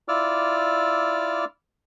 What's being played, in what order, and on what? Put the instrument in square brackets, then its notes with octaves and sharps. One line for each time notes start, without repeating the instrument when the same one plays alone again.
[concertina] E4 F4 D5 D6 E6 F6